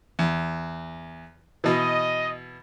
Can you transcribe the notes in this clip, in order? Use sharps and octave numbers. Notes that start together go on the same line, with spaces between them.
E2
B2 E3 D#5